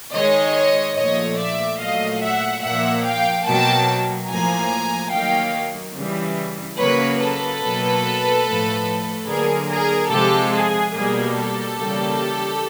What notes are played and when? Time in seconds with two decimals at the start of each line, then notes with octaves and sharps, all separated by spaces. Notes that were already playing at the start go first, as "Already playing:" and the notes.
0.13 D#3 G#3 C#5 D#5
0.96 A#2 F3 A3 C#5 D#5
1.38 D5 E5
1.79 A#2 F#3 A3 D#5 F5
2.21 E5 F#5
2.63 A#2 F3 A#3 E5 F#5
3.04 F5 G5
3.46 B2 F#3 A#3 G5 A5
4.28 A2 F3 A#3 G#5 A#5
5.12 D#3 F#3 A#3 F5 G5
5.95 C#3 E3 G3
6.79 C#3 F#3 A#3 B4 C#5
7.19 A4 B4
7.62 B2 F#3 A#3
8.45 A2 F3 A3
9.28 D3 F#3 A#3 G#4 A#4
9.69 G#4 A#4
10.10 C3 F3 G#3 G4 A4
10.53 G#4
10.94 B2 G3 A#3 G#4
11.35 G4 A4
11.77 C#3 E3 G3 A#3